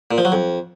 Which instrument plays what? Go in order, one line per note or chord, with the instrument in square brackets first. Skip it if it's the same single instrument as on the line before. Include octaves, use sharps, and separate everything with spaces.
[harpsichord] A#2
F3
F#3
F2